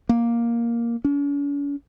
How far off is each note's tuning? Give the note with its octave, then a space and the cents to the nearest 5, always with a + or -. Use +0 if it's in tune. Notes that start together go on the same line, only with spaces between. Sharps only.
A#3 +5
C#4 +45